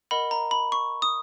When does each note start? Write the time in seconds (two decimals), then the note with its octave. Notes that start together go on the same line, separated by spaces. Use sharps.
0.11 A#4 D#5 F#5 B5
0.31 A#5
0.51 B5
0.72 C#6
1.02 D#6